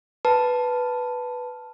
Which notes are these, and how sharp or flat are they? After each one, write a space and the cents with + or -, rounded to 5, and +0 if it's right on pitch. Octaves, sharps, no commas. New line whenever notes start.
B4 +0 A5 +0